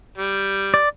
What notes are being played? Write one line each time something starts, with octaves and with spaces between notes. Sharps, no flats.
G3
D5